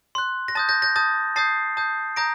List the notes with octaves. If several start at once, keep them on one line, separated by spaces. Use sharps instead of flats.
C6 F#6
A#6
A5 D#6 G6 A6
G6 A#6
G6 A#6
A5 D#6 G6 A6
A5 D#6 G6 A6 C7
A5 D#6 G6
A#5 D#6 G6 A#6 D7